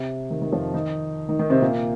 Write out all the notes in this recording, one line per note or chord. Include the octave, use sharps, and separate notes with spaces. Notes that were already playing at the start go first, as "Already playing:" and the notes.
Already playing: C3
D#3
D#3
F2 F3
D#3 D#4
D#3 D#4
D#3 D#4
C3 C4
A#2 A#3